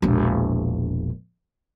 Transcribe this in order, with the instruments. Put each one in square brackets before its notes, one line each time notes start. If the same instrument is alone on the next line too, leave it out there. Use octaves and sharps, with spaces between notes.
[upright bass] E1 A#1